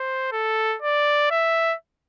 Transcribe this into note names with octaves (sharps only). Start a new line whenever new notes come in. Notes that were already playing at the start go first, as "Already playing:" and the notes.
Already playing: C5
A4
D5
E5